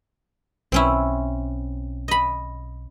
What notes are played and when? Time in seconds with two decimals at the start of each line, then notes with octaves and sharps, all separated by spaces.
0.72 B1 C4 C#4 E4
2.08 D#5 B5